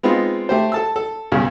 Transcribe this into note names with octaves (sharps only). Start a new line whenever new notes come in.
G#3 B3 C4 D#4 F4
A3 G4 C5
A4 A5 E6
A4
B1 G2 C#3